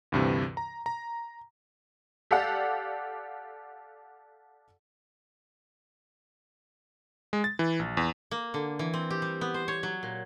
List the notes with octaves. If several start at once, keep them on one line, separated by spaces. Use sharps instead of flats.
D2 G2 C3 E3
A#5
A#5
G4 A4 D5 F5 F#5
G#3
A6
E3
A#1
E2
A#3
D3
E3
C4
G4
G3
B3
C5
C#5
F#3
A#2